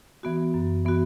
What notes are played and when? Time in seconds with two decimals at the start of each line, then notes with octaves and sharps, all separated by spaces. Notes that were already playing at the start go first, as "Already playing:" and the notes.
0.23 E3 B3 F#4
0.54 F#2
0.85 E3 B3 F#4